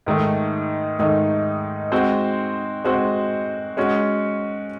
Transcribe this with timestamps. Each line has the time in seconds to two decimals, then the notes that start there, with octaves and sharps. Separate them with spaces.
0.06 G#2 D#3 A3 D#4
0.99 G#2 D#3 A3 D#4
1.92 G#3 C4 F#4 C5
2.84 G#3 C4 F#4 C5
3.77 G#3 C#4 F#4